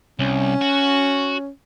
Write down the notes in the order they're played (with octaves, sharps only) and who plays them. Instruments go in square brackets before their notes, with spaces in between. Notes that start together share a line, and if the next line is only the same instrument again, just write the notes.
[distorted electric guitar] C2 [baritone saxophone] C#4
[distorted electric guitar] F#4